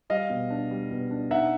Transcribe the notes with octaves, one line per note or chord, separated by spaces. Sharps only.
G3 D#5 F5
B2
D4
G3
B2
D4
D#4 E5 F#5